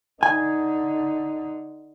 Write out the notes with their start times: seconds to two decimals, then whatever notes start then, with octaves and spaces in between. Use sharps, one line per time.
0.23 D3 D#4 G#5